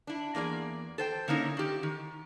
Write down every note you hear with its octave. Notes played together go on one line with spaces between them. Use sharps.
D4 E4
E2 A#3 G#4 D5
A4 C5 G5
D3 A#3 C#4 D#4 E4
D#3 G4
D#3